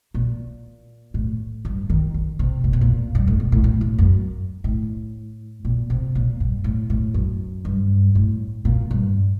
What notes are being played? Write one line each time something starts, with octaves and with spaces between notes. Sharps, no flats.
A#2
A2
G2
D#3
D3
C3
A#2
C3
A#2
G2
A2
A#2
A2
A2
A2
F#2
A2
A#2
C3
A#2
G2
A2
A2
F#2
G2
A2
A#2
G2